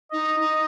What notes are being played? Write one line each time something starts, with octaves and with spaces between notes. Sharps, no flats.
D#4 D#5
D#4